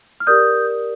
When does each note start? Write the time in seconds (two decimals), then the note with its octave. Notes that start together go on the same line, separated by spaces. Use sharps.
0.20 F6
0.27 G4 A#4 D5 D#6 G6